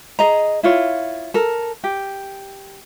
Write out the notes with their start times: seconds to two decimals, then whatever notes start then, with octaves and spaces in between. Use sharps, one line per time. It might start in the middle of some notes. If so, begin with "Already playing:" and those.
0.19 G#4 D#5 A#5
0.63 E4 F4 C#5
1.34 A4 A#4
1.84 G4